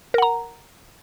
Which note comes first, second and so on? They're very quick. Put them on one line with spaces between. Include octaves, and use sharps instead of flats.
A#4 F#5 A#5